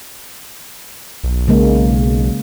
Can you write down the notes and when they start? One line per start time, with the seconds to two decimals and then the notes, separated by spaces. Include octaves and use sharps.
1.23 B1
1.48 C#3 G#3 A#3